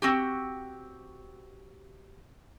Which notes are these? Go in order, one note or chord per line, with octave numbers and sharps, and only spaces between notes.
C4 F#4 G4